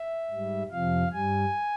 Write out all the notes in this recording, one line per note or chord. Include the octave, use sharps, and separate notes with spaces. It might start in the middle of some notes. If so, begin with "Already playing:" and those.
Already playing: E5
G#2 G3
F2 C3 F3 F5
G2 G3 G#5